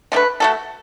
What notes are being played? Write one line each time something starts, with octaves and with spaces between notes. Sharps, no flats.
D3 A3 D4 B4
A3 F#4 A4